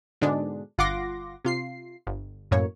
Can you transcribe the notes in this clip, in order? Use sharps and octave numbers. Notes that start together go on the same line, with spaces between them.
G#2 B2 D3 G#3 D4
G1 F4 F#5 C6 D6 A#6
C3 F4 C7
G1
F#2 A2 A#3 C#5